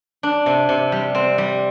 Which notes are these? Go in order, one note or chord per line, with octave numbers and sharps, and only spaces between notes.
D4
C3
C3
G3
C4
G3